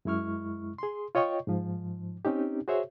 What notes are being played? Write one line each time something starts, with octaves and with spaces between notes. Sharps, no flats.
F#2 G#3 E4 C#6 F6
G#4 C6
F4 C#5 D#5 G5 C#6
G#2 F3
C4 C#4 D#4 G4
F#4 G#4 C5 C#5 E5